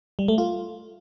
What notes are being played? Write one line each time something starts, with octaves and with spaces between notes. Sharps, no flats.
G3
A3
F4